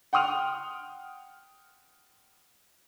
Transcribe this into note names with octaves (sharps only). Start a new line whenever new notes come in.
F#5 G5 C6 D#6 F6 F7